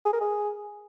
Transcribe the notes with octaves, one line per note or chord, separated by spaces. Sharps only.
G#4
A#4
G#4